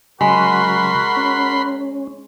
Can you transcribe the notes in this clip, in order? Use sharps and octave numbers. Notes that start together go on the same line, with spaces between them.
C#3 F#3 G#3 F#4 A#4 B5 C6
C#4